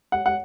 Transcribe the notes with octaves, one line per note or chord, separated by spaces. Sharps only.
F#5
F#5